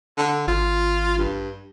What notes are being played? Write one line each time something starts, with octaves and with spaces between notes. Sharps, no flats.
D3
G#1 F4
G2